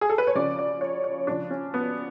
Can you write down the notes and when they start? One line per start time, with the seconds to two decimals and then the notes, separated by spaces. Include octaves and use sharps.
0.01 G#4
0.10 A4
0.18 B4
0.27 C#5
0.35 C#3 F3 D5
0.59 D5
0.81 C#5
1.04 C#5
1.27 C#3 F3 D4
1.50 C#4
1.74 B3